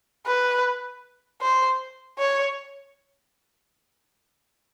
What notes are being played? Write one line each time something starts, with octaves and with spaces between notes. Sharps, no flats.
B4
C5
C#5